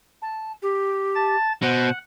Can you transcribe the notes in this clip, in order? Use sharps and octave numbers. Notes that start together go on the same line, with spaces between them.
A5
G4
A5 A6
B2 C5 F#5